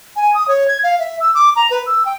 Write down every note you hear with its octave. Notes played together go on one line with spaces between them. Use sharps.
G#5
D#6
C#5
G#6
F5
E5
E6
D6
A#5
B4
E6
G5